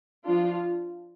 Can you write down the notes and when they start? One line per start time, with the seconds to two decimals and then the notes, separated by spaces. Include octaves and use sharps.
0.24 F3 D4 F4